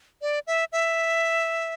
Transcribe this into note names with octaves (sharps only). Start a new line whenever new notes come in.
D5
E5
E5